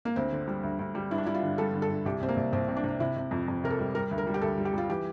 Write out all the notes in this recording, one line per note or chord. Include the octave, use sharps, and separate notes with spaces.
A#3
D2 C4
D3
G3
D2
D2
G3
G2 E4
D4
G3 E4
F4
D3
G3 A4
D3
A4
D3
C2 G4
C2 C4
A#3
C2
C2 C4
C3
D4
C3
C3 E4
C3
F2
F2
C3 A#4
A4
G3
G3 A#4
D2
A#4
G3
G4
D2 A4
G3
G4
G3 F4
E3 G4